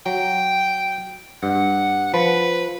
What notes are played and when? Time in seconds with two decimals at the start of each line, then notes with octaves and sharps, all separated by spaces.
0.06 F#3 G5
1.43 G2 F#5
2.14 F3 B4